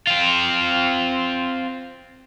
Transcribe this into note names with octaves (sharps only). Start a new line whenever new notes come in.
C4 F4